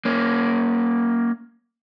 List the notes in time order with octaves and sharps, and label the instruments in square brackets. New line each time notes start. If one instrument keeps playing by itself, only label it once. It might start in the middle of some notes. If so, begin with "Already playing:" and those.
[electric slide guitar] A#3 C#4